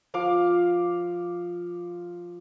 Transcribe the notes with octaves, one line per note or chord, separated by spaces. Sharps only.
F3 F5 D6